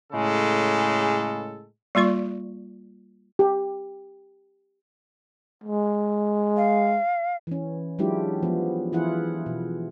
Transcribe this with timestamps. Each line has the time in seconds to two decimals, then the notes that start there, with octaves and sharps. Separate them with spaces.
0.13 A2 C#3 G#3 A4
1.95 G3 A#3 F4 D5 C#6
3.39 G4
5.64 G#3
6.57 F5
7.47 E3 C#4
7.99 F#3 G#3 D4 E4 F4 G4
8.43 F3 B3
8.92 E3 E4 F4 G#4 F#5
9.46 B2